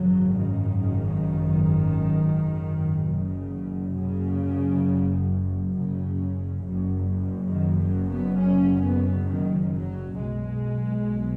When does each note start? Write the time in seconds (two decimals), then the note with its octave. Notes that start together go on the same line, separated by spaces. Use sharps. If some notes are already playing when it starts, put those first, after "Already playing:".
Already playing: G#1 F#2 C#3 F#3
0.37 D#3
3.03 F#1 F#2 C#3
3.93 C#3
5.71 C#3
6.61 F#1 F#2 C#3
7.49 D#3
7.78 F#3
8.08 B3
8.38 C#4
8.82 B3
9.27 D#3
9.72 F#3
10.16 B1 B2 G#3